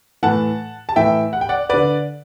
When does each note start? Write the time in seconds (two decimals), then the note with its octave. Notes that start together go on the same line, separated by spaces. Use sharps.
0.23 A2 E3 F#5 A5
0.89 A5
0.96 A2 E3 E5 G5
1.33 F#5
1.41 G5
1.49 D5 F#5
1.69 D3 B4 D5